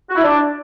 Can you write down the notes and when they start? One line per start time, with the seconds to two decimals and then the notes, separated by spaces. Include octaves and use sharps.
0.10 F#4
0.16 E4
0.23 D4